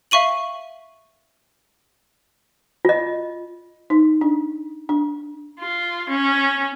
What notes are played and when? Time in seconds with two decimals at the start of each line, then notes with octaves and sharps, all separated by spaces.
0.11 E5 F5 C#6 D#7 F#7
2.85 F4 D#5
3.90 D#4
4.21 D4
4.89 D4
5.60 F4
6.10 C#4